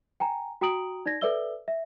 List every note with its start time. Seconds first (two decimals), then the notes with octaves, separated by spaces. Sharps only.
0.20 G5 G#5 A#5
0.61 F#4 G5 A#5 D#6 D7 F#7
1.06 D#4 D5 G#6 A#6
1.21 A4 B4 D5 E5 E6 G7
1.68 E5